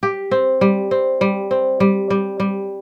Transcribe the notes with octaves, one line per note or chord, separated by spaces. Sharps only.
G4
C4
G3
C4
G3
C4
G3
G3
G3